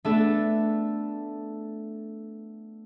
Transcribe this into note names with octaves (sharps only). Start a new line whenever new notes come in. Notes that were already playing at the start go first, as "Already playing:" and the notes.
A3 B3 D4 A4 A6